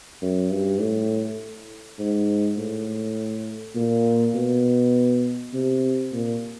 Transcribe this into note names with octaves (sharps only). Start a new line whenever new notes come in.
F#2
G2
A2
G#2
A2
A#2
B2
C3
A#2